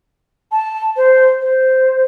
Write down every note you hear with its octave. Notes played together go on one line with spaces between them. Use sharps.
A5
C5
C5